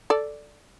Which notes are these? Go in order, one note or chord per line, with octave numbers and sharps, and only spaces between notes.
A4 D5